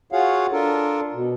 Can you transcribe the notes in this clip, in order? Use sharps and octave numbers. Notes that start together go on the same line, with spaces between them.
F4 F#4 G#4 C#5 F5 F#5
D4 F4 A4 A#4
B2